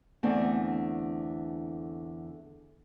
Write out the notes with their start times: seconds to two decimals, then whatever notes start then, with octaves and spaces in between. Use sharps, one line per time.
0.23 E2 D3 A3 C4 D4